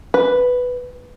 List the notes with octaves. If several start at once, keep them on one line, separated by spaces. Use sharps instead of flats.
B4